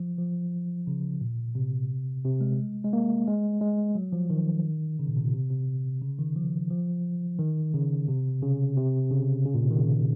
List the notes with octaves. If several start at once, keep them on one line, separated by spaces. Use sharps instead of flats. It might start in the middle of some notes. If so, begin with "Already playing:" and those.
Already playing: F3
F3
C#3
A#2
C3
C3
G#3
G#3
A#3
G#3
G#3
F#3
F3
D#3
C#3
A#2
C3
A#2
C3
C3
C#3
D#3
F3
F3
D#3
C#3
C3
C#3
C3
C#3
C#3
A#2
C3
D#3
C#3